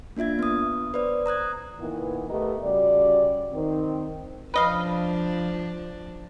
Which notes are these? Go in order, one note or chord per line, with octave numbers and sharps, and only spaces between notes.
A#3 D4 F4 E5 G#6
B3 D#6
B4 C5 D5 D#6
A#5 D#6 F#6 G#6
A#2 D#3 E3 B3 E4
A3 B3 G4 A#4 D#5
C#3 G3 F#4 D5
D#3 C4
F3 D4 B4 D#5 F5